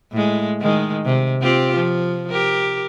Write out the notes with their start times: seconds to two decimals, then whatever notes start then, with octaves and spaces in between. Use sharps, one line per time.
0.12 A2 G#3
0.61 D#3 G#3
1.05 C3
1.42 C4 F4 G4
1.76 F3
2.29 G4 A#4